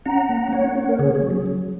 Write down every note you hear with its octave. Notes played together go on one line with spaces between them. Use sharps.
C#4 F#5 A#5
A#3
A#3 C#5 F#5
C#4
A#4
C#3 G#4 C#5
G#4 C#5
F#3
G#4
F#3